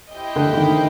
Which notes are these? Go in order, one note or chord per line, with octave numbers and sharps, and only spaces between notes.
E4 G4 C5 D#5 G5
D3
D3
D#3